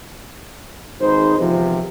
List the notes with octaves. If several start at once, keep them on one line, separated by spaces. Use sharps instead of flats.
G#1 G#2 D#4 G#4 B4 C5
G#1 E2 C3 F3